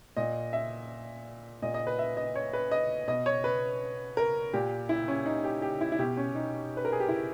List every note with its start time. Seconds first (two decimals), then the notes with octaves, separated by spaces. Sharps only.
0.17 A#2 D#5
0.53 E5
1.62 A#2 D#5
1.74 D#5
1.87 B4
1.99 E5
2.17 D#5
2.35 C#5
2.53 B4
2.71 D#5
3.08 B2 D#5
3.26 C#5
3.44 B4
4.17 A#4
4.53 A#2 G4
4.89 E4
5.08 C#4
5.26 D#4
5.44 G4
5.62 G4
5.81 E4
5.92 E4
5.99 B2 G4
6.17 C#4
6.35 D#4
6.77 B4
6.85 A#4
6.92 G#4
7.00 G4
7.08 E4